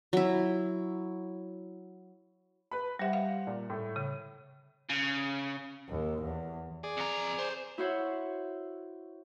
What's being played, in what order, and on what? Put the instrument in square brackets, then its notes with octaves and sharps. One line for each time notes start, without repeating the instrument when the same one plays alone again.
[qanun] F#3 E4
[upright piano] B4 B5
[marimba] G3 E5 [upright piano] G4 C5 F#5
[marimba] F5
[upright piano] A#2
A2 A3
[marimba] C#3
[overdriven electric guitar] C#3
[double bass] D#2
E2
[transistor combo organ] G#4 D5
[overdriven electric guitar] F2 A#5
C5
[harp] E4 F#4 C5 C#5 E5 F#5